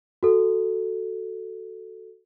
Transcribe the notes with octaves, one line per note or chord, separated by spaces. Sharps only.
F#4 A4